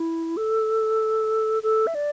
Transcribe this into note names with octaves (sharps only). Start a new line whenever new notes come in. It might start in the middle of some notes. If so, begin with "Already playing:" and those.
Already playing: E4
A4
A4
E5
D5